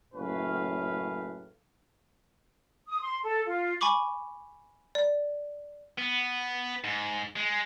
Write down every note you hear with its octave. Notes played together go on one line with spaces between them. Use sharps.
F#1 A2 C#4 B4 F5
D#6
C6
A4
F4
G#5 B5 C#6 D6 F#7
D5
B3
G#2
G#3